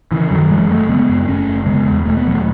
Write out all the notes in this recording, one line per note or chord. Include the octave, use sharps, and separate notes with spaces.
C#3 E3
F#2 D#3 F#3
F#1 E3 G#3
F#1 F#3 A3
C#3 G#3 B3
F#2
F#1 A3 C#4
F#1
C#3 G#3 B3
E2
E1 A3
B3
E1 F#3 A3